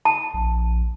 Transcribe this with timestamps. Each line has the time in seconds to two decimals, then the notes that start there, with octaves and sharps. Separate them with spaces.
0.05 A5
0.34 A#1